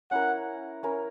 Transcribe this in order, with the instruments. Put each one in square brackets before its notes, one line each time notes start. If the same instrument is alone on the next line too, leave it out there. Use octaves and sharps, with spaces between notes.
[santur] C#4 E4 A#4 [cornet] F#5
[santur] C#4 E4 A#4